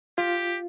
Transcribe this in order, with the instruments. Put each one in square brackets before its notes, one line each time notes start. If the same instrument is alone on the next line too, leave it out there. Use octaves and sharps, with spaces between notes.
[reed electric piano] F4 [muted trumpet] G4